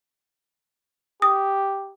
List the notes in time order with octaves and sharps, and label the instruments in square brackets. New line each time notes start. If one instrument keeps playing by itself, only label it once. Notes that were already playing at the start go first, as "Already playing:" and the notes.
[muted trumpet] G4 [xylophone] D#6